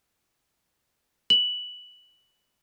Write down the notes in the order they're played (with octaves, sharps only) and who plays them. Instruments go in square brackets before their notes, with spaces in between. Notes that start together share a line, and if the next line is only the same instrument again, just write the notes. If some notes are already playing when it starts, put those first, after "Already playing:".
[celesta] F#7